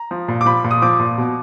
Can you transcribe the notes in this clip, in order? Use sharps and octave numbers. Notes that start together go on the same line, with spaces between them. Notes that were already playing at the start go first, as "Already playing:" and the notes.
Already playing: A#5
F3
A#2
D6
F3 B5
A#2
D#6
F3 D6
A#2
B2